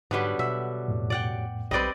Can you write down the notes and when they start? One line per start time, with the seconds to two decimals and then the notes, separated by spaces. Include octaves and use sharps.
0.11 G#2 D3 F#3 G3 B3 B4 D6
0.39 B2 E5
0.88 F2 A2
1.10 D5 F#5 G5
1.71 B1 G3 C4 B4 D5 D#5